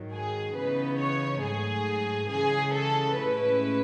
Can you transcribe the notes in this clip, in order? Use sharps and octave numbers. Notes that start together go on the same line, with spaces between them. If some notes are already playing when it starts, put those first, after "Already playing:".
Already playing: G#2 D#3 F#3
G#4
C#3 E3 B3 D#4 B4
C#5
G#2 F#3 A3 G#4
C#3 E3 G#3 G#4
A4
A2 G#3 C#4 E4 B4